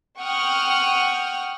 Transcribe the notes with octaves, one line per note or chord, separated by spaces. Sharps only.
F#5 G5 C#6 D#6 F6